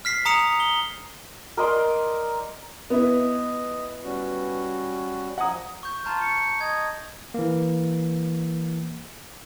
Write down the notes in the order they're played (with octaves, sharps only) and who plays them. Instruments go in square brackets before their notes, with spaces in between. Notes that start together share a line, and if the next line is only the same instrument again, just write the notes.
[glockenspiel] F6 B6 C7
A#5 D#6 C#7 F7
G7
[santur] A#4 D5 D#5 C6
[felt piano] B3 E4 [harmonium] D#5
[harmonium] G3 C#4 F#4
[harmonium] F3 G#5 [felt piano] F#5 A#5 D#6
[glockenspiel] C#6 G6
[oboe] F4 [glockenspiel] A5 A#5 G6
[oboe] C#6
[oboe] D#5 [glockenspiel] G#6
[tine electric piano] E3 A#3